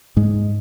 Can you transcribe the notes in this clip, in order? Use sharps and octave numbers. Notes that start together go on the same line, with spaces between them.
G#2 G#3